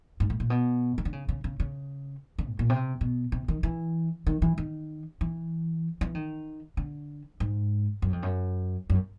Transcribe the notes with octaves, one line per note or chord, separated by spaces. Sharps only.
G#2
A2
A#2
B2
D#3
D3
C#3
C#3
C#3
C#3
D3
G#2
A#2
C3
B2
C3
D#3
E3
D#3
E3
D#3
E3
E3
D#3
D3
G#2
F#2
F2
F#2
F#2